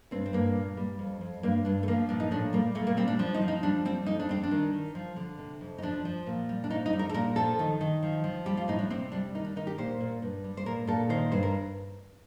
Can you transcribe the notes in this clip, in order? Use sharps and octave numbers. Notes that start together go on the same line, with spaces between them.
G2 C4
C4
G2 A#3
A#2
G3
F2
F2
G2 A#3
G2 D4
A3
F3 A#3
A#2 D4
D#4
A2 D4
G3 A#3
A#2 A3
A#3
G3 C4
D4
F3 D4
D#4
F3
D#4
G3 D4
G3 C4
F2 D#4
D4
G3 C4
D4
D#3
D#3
F3
D3
C3
F2
D#4
F3 D4
F3
A#2
G3
D4
F2 D#4
D#4
G3
A#4
A4
A#2 A#4
F3 A4
D#3
D#3
F3
F3
G3 G4
F4
A2 D#4
D4
C3 C4
G3 D4
D#3 D#4
D4
D#3 D#4
G4
A#2 C5
A#2
G2
G3
C5
A#2 A#4
A#2 A4
D#3 C5
G2 C5
A#4